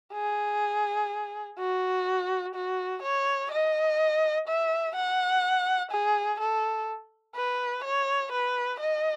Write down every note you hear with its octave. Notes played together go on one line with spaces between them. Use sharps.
G#4
F#4
F#4
C#5
D#5
E5
F#5
G#4
A4
B4
C#5
B4
D#5